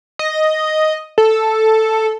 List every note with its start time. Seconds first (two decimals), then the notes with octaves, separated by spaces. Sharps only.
0.19 D#5
1.18 A4